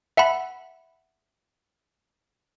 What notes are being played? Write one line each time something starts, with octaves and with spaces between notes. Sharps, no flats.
E5 F#5 A5 B5